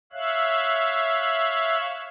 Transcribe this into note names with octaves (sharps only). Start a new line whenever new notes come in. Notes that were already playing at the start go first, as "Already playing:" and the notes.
C#5 E5 F5 F#6